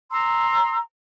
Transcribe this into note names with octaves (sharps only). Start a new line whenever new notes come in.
A#5 C6 E6